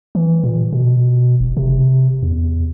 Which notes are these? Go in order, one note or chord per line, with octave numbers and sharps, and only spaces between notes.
E3
A#2
B2
E1
C3
E2